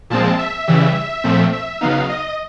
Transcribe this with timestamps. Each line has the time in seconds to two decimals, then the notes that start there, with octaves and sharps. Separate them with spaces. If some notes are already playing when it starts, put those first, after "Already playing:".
0.10 A#2 F3 G#3 C4 A5
0.39 E5
0.68 C#3 E3 G3
1.24 A#2 F3 A3 C4
1.53 E5
1.81 C#3 F#3 B3 D#4 F5
2.09 D#5